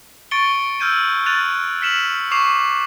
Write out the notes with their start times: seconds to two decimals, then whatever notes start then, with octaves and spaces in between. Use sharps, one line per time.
0.31 C#6 A6 C#7 D7 G7
0.80 E6 F6 G6 G#6 D#7
1.26 F6 F#6 A6 D#7 F7
1.81 F6 B6 C#7 E7 F#7
2.31 C#6 D6 C7 F7